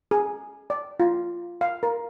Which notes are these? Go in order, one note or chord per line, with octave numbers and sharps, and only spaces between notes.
G#4
D5
F4
F5
A#4